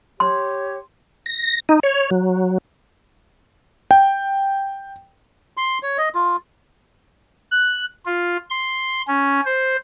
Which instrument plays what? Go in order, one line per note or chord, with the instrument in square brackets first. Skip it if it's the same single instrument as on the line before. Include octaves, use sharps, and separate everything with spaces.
[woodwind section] G4 C#5 [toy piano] C6
[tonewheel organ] A#6
D#4
C#5
F#3
[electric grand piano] G5
[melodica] C6
C#5
D#5
F4
[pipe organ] F#6
F4
C6
C#4
C5